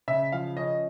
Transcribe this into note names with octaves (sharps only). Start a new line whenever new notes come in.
C#3 E5
F3 F5
C#4 D#5